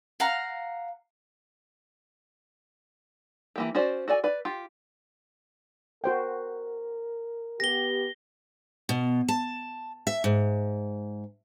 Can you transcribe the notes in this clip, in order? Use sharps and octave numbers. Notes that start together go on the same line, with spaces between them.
F5 F#5 A#5
E3 A#3 G4
C#4 F#4 C5 D5
F#4 A4 D5 G#5
B4 D5
F4 G4
F#4 A#4 C5 G5
B3 G4 A#6 G7
B2
A5
E5
G#2